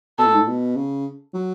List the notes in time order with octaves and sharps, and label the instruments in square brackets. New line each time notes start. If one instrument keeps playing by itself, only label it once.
[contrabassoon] B2 [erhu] A4
[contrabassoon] A2
G#2
A2
B2
C#3
F#3